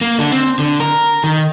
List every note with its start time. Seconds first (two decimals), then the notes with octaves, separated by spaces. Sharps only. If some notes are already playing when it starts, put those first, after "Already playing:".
0.01 A#3
0.19 D3
0.32 C4
0.59 D3
0.80 A#4
1.24 D#3